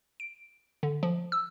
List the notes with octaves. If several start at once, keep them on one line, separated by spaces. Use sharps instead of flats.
D7
D3
F3
E6